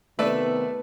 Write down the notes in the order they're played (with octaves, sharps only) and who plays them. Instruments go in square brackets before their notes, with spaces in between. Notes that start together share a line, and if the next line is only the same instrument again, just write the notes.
[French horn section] C3 D#3 B3 [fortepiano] A3 D5 E5 [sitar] B4